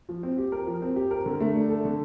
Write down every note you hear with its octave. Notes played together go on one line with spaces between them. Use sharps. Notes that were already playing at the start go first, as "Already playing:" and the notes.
F3
C4
G4
A#4
F3
C4
G4
A#4
D3
A3
D4
A4
D3